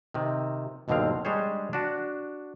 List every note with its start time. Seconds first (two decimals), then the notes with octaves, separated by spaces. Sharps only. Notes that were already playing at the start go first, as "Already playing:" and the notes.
0.14 C3 D#3
0.88 G1 D#2 B2 D3 C4 F5
1.25 G3 G#3 D4 G#4 C5 C#5
1.73 D4 F#4